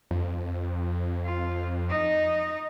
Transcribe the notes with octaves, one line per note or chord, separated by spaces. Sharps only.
F2
F4
D#4 D#5